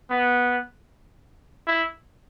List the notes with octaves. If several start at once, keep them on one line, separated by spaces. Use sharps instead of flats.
B3
E4